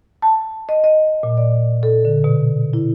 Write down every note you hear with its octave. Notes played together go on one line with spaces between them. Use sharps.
A5
D#5
D#5
A#2
D5
A4
D3
B2
E4